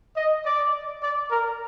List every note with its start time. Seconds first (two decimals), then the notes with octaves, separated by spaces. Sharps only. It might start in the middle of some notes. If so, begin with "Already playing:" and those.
0.16 D#5
0.45 D5
1.02 D5
1.31 A#4